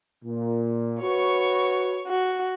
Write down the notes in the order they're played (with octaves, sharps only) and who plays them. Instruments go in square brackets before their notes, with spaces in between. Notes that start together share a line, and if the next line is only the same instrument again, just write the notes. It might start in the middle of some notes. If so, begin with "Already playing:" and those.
[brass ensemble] A#2
[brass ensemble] F#4 B4 [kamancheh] C#5 C#6
[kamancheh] F#4